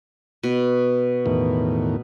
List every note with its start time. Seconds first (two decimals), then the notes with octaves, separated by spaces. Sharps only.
0.43 B2
1.26 E2 A2 D#3